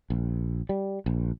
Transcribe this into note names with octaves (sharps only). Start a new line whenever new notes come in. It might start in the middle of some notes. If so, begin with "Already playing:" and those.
A#1
G3
A#1